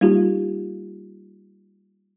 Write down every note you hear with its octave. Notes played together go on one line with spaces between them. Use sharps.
G3 A#3 D#4 F4 G4